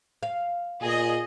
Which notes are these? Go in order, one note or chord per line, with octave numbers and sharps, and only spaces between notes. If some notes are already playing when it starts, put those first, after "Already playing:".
F5
A#2 G#4 D#5